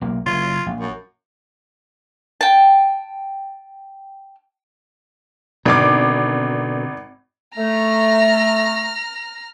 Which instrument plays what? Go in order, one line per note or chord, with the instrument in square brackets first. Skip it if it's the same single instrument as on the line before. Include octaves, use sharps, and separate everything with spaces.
[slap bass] B1 A#3
[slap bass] F#1 [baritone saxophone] F4
[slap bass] A#1
[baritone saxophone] F#2
[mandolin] G5 A5
[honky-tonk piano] G#1 D6 [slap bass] B2 D3
[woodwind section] A3 [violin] A#5 F6